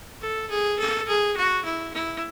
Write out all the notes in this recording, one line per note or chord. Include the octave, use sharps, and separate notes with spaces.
A4
G#4
A4
G#4
F#4
E4
E4